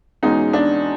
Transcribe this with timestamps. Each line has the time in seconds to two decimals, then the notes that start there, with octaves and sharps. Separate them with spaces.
0.23 E2 B2 G#3 C#4 D#4
0.53 D4